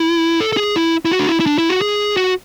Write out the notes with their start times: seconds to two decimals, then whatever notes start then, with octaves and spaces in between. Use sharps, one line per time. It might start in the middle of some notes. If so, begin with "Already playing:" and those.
Already playing: E4
0.40 A4
0.53 A4
0.57 G#4
0.76 E4
1.05 E4
1.12 F#4
1.20 D4
1.29 E4
1.40 E4
1.46 D4
1.58 E4
1.70 F#4
1.81 G#4
2.17 F#4